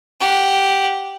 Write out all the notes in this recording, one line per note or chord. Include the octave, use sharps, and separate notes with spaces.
G4 F#5